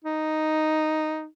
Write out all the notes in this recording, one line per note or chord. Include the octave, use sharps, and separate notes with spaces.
D#4